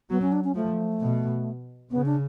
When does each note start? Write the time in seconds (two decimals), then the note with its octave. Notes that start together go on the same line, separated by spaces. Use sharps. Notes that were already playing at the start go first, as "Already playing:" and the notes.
0.10 F#3 B3
0.22 C#4
0.32 D4
0.44 C#4
0.55 F3 A3
1.00 B2
1.91 C#3 B3
2.06 D4